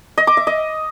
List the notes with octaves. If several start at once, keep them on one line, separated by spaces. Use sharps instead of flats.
D#5
D6
E5
D#5